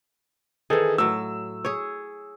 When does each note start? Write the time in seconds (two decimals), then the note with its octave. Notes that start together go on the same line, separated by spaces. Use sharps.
0.70 D#3 E3 G#4 A4
0.98 A2 F#3 E6
1.65 G#4 C#5